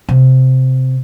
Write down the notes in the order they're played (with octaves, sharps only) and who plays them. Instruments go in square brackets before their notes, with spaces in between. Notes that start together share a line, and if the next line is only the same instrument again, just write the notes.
[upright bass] C3